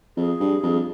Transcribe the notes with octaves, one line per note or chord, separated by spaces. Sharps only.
F2 G#4
G2
F2